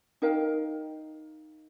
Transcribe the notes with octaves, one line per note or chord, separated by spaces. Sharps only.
D#4 A#4 F5 G5